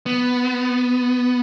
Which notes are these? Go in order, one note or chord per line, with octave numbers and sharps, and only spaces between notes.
B3